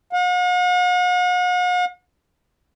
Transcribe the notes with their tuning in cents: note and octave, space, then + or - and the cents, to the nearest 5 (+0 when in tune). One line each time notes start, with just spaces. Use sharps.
F#5 -45